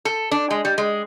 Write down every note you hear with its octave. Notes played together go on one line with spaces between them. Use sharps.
A4
D4
G#3
G3
G#3